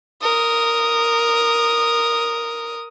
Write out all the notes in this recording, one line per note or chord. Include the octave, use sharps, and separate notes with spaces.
A#4 D#6